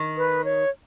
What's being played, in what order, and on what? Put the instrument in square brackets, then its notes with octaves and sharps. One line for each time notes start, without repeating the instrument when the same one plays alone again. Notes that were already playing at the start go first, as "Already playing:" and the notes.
Already playing: [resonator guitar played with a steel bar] D#3
[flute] B4
C#5